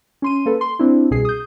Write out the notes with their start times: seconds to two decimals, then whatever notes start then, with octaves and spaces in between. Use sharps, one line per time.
0.22 C#4 C6 D#7
0.46 A#3 A4 B4
0.61 C6
0.79 C4 D4 E4
1.11 C2 B2 G#4 C7
1.25 D#6 G6